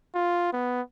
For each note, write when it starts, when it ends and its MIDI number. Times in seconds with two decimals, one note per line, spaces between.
0.15 0.51 65
0.53 0.82 59